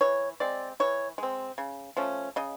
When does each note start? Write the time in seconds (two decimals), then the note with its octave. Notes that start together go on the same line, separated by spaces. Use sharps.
0.01 E3 C#5
0.40 G#3 C4 D5
0.80 E3 C#5
1.18 G#3 C4
1.58 C#3
1.97 F3 A3 C#4
2.36 C#3 D#5